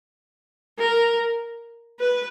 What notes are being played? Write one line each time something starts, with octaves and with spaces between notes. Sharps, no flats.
A#4
B4